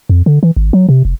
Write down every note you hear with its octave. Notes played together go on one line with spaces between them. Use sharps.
F2
D3
E3
G#1
F#3
C3
F1